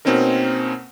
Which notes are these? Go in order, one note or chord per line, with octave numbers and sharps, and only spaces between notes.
B2 A#3 C4 C#4 D#4 A#4